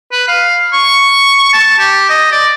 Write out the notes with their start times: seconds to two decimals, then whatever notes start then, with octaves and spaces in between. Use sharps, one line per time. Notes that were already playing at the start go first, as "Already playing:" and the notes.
0.12 B4
0.28 F5
0.73 C#6
1.53 A5
1.79 G4
2.09 D#5
2.32 D5